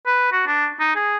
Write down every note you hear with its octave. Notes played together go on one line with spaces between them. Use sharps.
B4
F#4
D4
D#4
G#4